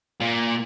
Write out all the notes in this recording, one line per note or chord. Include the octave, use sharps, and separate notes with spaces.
A#2